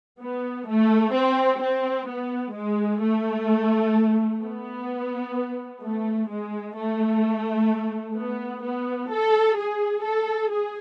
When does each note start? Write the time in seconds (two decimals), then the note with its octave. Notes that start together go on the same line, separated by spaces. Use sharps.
0.20 B3
0.67 A3
1.14 C4
1.61 C4
2.08 B3
2.54 G#3
3.01 A3
4.41 B3
5.82 A3
6.29 G#3
6.75 A3
8.15 B3
8.63 B3
9.09 A4
9.56 G#4
10.03 A4
10.50 G#4